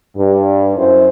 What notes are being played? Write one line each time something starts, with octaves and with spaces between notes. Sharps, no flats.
G2
F#2 E4 C5